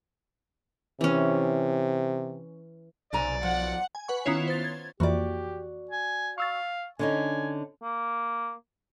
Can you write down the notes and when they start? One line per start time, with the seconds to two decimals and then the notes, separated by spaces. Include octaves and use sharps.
1.01 C3 E3 C#4
3.13 B1 C3 D5 G#5 A#5
3.43 F3 F#5
3.95 G#5
4.08 B4 F#5 C#6
4.25 D#3 B3 C#4 E4 F4 C#5
4.48 C5 A6
4.64 G#6
5.00 F2 E3 A#3 F#4 G4 D5
5.91 G#5
6.38 F5 C#6 E6 A6
6.99 D3 C#4 D#4 G#5
7.83 A#3